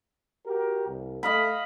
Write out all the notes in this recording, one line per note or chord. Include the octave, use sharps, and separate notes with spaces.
F#4 G4 A#4
C2
A3 D#5 F5 B5